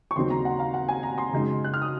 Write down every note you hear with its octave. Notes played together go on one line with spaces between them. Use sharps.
C#6
D#2 C#3 F#3 C4 D#4 C6
A#5
F#5
F5
F#5
G#5
A#5
C6
F#2 C#3 G#3 D#4
F#6
F6
D#6